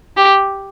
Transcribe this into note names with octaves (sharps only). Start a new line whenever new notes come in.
G4